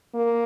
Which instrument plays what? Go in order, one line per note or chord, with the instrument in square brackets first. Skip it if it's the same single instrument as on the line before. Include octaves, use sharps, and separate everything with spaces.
[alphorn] A#3